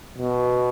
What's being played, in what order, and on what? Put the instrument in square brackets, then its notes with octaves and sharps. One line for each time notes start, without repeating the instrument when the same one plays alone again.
[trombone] B2